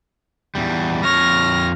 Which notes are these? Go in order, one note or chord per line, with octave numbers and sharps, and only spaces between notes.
E2 G3
F2 C#5 F6 A#6